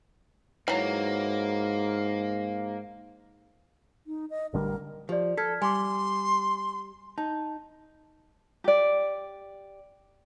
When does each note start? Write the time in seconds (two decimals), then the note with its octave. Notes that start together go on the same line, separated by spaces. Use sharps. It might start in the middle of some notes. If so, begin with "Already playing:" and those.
0.68 G#2 E3 F#3 A#3
4.07 D#4
4.30 D#5
4.53 A1 D3 G3 A#4
5.09 F3 G4 D5
5.37 A4 F6 G#6 B6
5.62 G3 G#5 C6 D6
7.18 D#4 A5
8.64 G4 D5